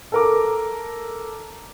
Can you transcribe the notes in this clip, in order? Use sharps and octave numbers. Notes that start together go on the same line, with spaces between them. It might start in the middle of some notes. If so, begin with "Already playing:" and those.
A4 A#4 D6